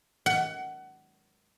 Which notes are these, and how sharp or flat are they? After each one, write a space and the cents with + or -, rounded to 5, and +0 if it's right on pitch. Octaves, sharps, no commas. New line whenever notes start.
F#5 +25